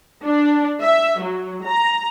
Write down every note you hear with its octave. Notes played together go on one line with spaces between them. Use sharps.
D4
E5
F#3
A#5